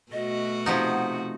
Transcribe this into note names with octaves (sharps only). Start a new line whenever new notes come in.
B2 A3 F#4 D#5
C3 F3 D#4 F#5